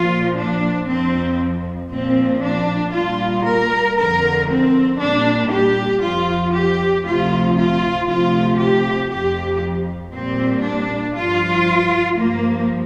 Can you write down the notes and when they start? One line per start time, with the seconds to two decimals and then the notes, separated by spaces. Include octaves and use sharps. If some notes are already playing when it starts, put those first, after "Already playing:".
Already playing: A#2 F3 F4
0.37 D4
0.88 F2 F3 C4
1.91 A#2 F3 C4
2.42 D4
2.93 A#2 G3 F4
3.46 A#4
3.96 F2 D3 F3 A#4
4.48 C4
4.99 A#2 G3 D4
5.51 G4
6.01 F2 F3 F4
6.53 G4
7.04 D2 C3 F3 F4
7.55 F4
8.07 D2 C3 F3 F4
8.58 G4
9.10 F2 F3 G4
10.13 A#2 G3 C4
10.64 D4
11.15 G2 F3 F4
12.17 G2 F3 A#3